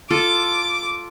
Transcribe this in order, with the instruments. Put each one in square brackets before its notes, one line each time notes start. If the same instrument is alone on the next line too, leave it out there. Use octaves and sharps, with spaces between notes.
[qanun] F4 A4 [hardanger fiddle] D6